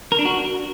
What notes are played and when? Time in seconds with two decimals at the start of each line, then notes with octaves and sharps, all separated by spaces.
0.12 A#4
0.19 D4
0.25 F#4